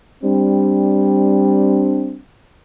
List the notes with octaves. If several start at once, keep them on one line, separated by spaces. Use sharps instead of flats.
G3 C4 D4